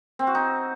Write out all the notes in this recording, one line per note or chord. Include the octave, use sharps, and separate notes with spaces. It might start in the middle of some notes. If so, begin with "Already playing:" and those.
C4
F#4
D#4